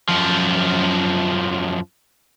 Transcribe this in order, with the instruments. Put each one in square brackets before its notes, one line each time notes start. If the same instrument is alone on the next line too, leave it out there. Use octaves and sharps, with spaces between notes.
[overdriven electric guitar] F#2 F3